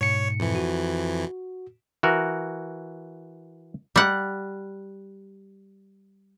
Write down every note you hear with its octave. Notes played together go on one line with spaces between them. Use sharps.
G#2 B2 C#5 C#7
F2 E3
F#4
E3 F#4 A#4
G3 F#5